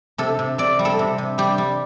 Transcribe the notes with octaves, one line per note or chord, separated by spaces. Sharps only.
C3 A4
C3
C3 D5
G3
A4
C3
C3
G3 G4
G3